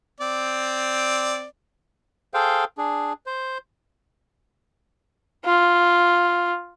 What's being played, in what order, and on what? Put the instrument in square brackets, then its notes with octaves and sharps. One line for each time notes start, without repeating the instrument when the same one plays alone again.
[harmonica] C4 D5
[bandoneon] G#4 A4 C5 F5 G5
D4 G#4
C5
[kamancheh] F4